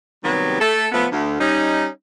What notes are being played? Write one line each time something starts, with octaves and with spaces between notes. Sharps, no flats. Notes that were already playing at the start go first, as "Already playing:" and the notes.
C3 D#3 F#3 G3 B3
A3 A4
F3 A3 B3
D2
G3 C#4 D#4